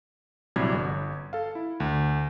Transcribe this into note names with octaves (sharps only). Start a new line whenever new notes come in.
A#1 C3 F#3 G3 E4 G#6
G1
A4 F5
E4
D2